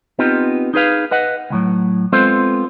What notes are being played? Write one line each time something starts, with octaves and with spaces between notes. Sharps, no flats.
B3 C4 D#4 F4 G4
D#4 G#4 B4 F5
B4 D#5 F#5
C#2 A2 F#3
G#3 B3 C4 F4 A4 C5